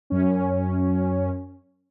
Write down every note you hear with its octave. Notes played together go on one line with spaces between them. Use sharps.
F#2 C#4